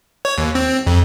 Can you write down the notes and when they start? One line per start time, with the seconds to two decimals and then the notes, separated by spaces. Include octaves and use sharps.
0.25 C#5
0.38 D#2
0.55 C4
0.87 F2